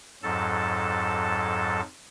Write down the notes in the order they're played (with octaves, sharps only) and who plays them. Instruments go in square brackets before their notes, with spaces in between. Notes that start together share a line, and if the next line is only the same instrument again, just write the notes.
[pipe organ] F2 G#2 F#3 A4 A5